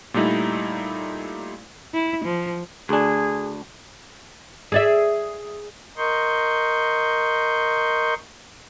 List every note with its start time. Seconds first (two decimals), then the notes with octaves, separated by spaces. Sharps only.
0.14 A#2 G3 A3 D#4 E4
1.94 E4
2.25 F3
2.89 D2 D4 G#4
4.72 G#4 D5 E5
5.98 A#4 D#5 C6 C#6 G6